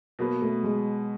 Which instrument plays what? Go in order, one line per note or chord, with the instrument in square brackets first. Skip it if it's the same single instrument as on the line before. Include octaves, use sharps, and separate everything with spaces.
[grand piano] B2 F#3 B3 [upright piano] A#3
[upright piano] A3
G#3